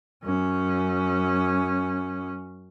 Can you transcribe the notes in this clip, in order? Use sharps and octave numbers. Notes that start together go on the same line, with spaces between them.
F#2 C#4